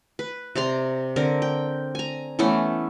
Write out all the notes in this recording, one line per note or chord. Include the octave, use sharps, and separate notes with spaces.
B4
C3 D5 A#5 C6
D3 C4 A#4
G5
G#5 A#5
E3 A3 B3 C#4